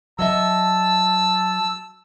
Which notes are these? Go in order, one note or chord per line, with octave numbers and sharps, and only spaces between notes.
F#3 D#5 E5 A5 E6